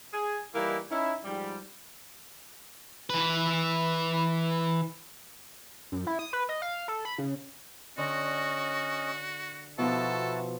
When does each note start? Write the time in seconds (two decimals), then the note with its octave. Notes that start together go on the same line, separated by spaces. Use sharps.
0.14 G#4
0.55 E3 G3 A#3 D#4 E4
0.91 C#4 D#4 E4
1.25 G#2 F3 G3
3.10 E3 B4
5.92 F#2
6.07 E4
6.19 D#6
6.33 B4
6.49 D#5
6.62 F5
6.88 A4
7.05 B5
7.18 C#3
7.98 D3 C#4 F#4 D#5
9.78 B2 F3 D#4 E4 F#4 A4 A5